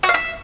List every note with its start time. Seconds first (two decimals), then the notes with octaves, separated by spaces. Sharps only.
0.03 F#4
0.09 F5
0.14 E5